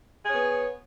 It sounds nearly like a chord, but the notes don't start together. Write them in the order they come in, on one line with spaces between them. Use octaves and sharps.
G#4 C#5 B3